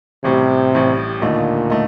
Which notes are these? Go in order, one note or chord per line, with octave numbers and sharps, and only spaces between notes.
A1 A2 C3 G3
A1 A2 G3
D#2 A#2 D3 A3 D#4
A3 D#4